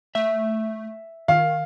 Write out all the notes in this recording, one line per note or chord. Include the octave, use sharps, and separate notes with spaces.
A3 E5
D#3 F5